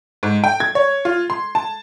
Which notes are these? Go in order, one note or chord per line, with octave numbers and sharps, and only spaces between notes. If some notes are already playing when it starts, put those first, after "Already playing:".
G#2
G5
G#6
C#5
F4
C6
A5